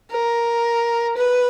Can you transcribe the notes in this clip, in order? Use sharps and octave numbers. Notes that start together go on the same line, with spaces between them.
A#4
B4